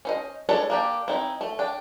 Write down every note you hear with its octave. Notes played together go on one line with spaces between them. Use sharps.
C#4 C5 D#5
G#3 D4 A4 B4 C#5
A#3 D4 G4
C4 D#4 E4
A3
D4 G5